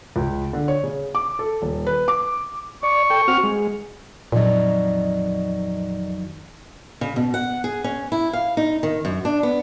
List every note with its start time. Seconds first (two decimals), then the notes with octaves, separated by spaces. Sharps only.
0.16 C#2
0.53 D3
0.68 C#5
0.84 C#3
1.15 D6
1.39 A4
1.62 D#1
1.87 B4
2.08 D6
2.83 D5 C#6
3.10 A4 G5
3.28 C4 F#4 F6
3.43 G#3
4.32 F2 A#2 D#3 F#3 D5 D#5
7.01 C#3
7.16 B2
7.34 F#5
7.64 G#4
7.84 C#4
8.12 E4
8.33 F5
8.57 D#4
8.83 D#3
9.05 F#2
9.25 D4
9.43 B3